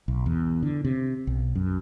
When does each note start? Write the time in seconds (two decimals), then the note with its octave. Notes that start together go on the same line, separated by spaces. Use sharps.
0.08 B1
0.26 E2
0.63 D3
0.85 C3
1.27 B1
1.55 F#2